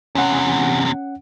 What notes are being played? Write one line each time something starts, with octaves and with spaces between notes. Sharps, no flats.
E2 C3 C#4 F#5